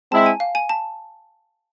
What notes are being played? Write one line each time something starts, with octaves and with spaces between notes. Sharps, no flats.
G#3 C4 E4 A5
G#5
F5
G#5
A5